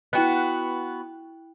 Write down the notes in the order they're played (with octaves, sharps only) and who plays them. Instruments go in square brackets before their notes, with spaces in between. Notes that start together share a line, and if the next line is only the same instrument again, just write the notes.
[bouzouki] B3 F#4 [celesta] E4 G5 F#6